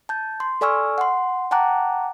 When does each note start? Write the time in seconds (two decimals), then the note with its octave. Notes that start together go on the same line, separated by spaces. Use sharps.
0.09 A5 G6
0.40 C6
0.61 A4 D5 G#5 C#6 E6 F6
0.98 F#5 C6
1.51 F#5 G5 A5 A#5 D6 F#6